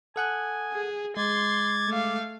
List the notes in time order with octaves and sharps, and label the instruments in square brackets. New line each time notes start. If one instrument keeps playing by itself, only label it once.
[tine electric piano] A4 F#5 F#6 [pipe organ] G#5 [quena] D#6
[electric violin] G#4
[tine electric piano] G#3 [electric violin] C6 [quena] D6 [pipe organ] G#6 A6
[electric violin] A3 F5